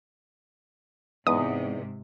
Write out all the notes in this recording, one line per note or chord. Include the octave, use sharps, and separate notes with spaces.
E2 G#2 C3 B3 D#4 D#6